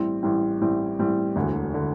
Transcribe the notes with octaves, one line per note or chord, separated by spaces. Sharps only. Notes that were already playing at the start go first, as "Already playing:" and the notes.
Already playing: A1 A2 G3 C4
A1 A2 G3 C4
A1 A2 G3 C4
A1 A2 G3 C4
E1 D2 D3
D3